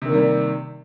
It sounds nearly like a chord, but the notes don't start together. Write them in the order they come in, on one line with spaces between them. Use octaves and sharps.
C3 D#3 A#3 G3